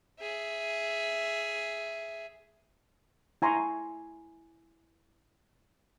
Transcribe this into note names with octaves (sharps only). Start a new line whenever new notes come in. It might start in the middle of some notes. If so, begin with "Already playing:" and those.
G#4 E5
E4 G#5 A#5 C6 C#6